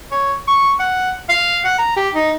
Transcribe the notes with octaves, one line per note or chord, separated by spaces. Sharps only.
C#5
C#6
F#5
F5
F#5
A#5
G4
D#4